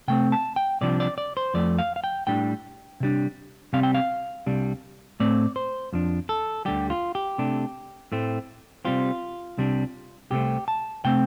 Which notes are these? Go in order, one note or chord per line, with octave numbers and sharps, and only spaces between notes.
C3 A3 C4 G5
A5
G5
C2 C3 F3 D4 D5
D5
D5
C5
F2 F3 A3 D5
F5
F5
G5
A2 G3 D4 G5
C3 G3 D4
C3 G3 C4 F5
G5
F5
C2 C3 G3 D4
A2 A3 C4 D5
C5
F2 F3 D4
A4
D2 D3 G3 G4
F4
G4
C3 A3 D4
A2 A3 C4
C3 G3 C4 F4
C2 C3 G3 D4
C2 C3 A3 C4 G4
A5
C3 A3 C4 G5